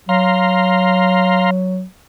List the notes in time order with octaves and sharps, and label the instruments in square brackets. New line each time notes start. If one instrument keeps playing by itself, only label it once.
[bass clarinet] F#3 [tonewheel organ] F5 A#5 C6